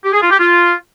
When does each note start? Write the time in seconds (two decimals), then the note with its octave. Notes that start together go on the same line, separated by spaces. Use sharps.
0.04 G4
0.13 G#4
0.22 F4
0.31 G4
0.39 F4